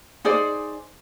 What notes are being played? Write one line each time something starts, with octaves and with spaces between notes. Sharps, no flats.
D#4 G#4 C5 D5